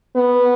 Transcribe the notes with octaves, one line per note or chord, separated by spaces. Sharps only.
B3